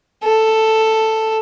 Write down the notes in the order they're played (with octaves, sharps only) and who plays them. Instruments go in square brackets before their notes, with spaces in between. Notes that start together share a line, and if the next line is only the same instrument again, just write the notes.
[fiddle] A4